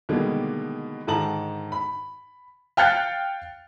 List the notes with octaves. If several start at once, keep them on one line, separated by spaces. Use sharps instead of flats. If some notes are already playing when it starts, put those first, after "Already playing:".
B2 D3 D#3 G3 G#3 A#3
G#2 D3 D#3 A5 A#5 F#7
B5
F5 G5 F6 F#6 A6 C#7